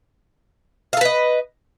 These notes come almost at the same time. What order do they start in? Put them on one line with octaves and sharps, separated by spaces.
F5 A4 B4 D#5